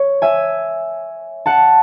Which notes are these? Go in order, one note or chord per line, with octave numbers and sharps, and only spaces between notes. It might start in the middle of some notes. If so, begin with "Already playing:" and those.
Already playing: C#5
E5 G#5
F#5 A5